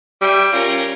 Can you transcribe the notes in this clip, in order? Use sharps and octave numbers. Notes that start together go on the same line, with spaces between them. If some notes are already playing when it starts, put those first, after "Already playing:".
G3 E5 G5
C#4 F4 A#4